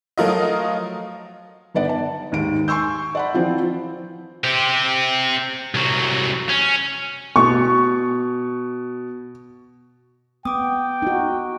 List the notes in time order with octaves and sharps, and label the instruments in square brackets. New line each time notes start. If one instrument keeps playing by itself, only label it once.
[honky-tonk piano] F3 F#3 A3 F4 A#4 D#5
[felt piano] G1 D#3 B3 D5 F#5
A5
D#2 G#2 D7
G#5 C6 C#6 E6 G6
D5 F#5 B5
E3 F3 C4 F4
[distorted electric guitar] C4 G4
C2 F#3
C#4
[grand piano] B2 [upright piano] C#6
[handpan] B3 [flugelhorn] G5 [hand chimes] D6 D#6
[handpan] D#4 F#4